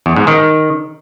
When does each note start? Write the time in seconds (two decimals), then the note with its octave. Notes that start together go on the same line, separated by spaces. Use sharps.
0.06 E2
0.16 G#2
0.27 D#3